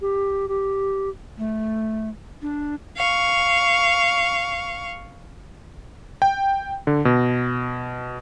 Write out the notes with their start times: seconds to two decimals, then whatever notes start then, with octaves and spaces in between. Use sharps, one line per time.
0.01 G4
0.48 G4
1.38 A3
2.42 D4
2.96 F5 C#6
6.22 G5
6.87 D3
7.05 B2